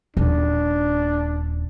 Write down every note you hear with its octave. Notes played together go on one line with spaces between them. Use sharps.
D#1 D4